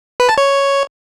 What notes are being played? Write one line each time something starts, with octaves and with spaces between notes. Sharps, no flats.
B4
A5
C#5